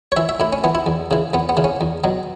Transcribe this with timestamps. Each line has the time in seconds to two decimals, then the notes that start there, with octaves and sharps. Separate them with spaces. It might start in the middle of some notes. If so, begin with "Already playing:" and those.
0.12 C#5
0.16 E3 E5
0.29 E5
0.40 A2 E4
0.53 C#4
0.64 E3 B3
0.75 E4
0.86 E2
1.11 C#3 E3
1.33 E2 B3
1.49 B3
1.57 C#3 E3
1.64 C#4
1.81 E2
2.04 B2 F#3